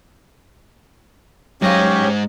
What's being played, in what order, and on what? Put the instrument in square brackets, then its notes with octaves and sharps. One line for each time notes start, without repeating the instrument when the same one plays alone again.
[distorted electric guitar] G#2 D#5 [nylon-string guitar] F#3 F5 [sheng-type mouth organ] C#4 G4 [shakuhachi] C#5